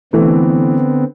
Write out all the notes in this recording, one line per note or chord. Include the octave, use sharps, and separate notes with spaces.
D3 E3 A3 B3 C4